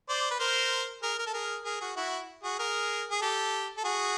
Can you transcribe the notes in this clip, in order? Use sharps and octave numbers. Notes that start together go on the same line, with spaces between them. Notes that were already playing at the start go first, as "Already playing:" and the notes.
C5 D5
B4
A#4 C5
G#4 A#4
A#4
A4
G#4 A#4
G#4 A#4
F#4 G#4
E4 F#4
F#4 G#4
G#4 A#4
G#4
G4 A4
A4
F#4 G#4